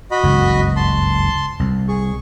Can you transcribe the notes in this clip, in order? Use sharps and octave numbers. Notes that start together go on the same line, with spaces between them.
F#4 D#5 B5
F#1 C#2 G2
A5 C6
C2
G#4 C#6